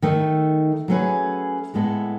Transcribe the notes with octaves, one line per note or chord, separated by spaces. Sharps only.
D#3 A3 D#4
F#3 A3 C#4 G#4 B4
A2 G#3 B3 E4 A4